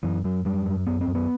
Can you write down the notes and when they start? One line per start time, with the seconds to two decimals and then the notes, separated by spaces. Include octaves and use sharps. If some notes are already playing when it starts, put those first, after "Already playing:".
0.03 F#2 E3
0.24 F#2 F#3
0.45 F#2 G3
0.66 F#2
0.87 F#2 B3
1.01 C4
1.07 F#2
1.15 B3